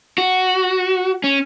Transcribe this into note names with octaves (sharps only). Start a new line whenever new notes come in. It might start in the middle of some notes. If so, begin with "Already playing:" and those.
F#4
C#4